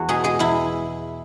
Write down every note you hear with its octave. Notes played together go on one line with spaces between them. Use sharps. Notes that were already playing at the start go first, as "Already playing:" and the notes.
Already playing: E2 F#4
B2 G#4
G#3 G#4
E2 E4